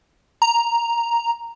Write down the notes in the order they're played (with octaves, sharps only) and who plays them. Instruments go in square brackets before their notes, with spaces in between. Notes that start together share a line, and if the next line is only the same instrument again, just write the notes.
[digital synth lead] A#5